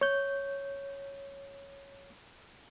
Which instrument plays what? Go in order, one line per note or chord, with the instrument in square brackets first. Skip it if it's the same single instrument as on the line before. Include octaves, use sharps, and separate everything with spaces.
[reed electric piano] C#5 G6